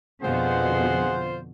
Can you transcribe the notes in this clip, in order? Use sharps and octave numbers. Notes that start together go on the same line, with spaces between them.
F2 B2 D3 F4 G#4 C5 F#5